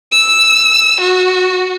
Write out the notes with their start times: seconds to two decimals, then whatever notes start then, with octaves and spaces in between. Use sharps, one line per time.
0.12 E6
1.01 F#4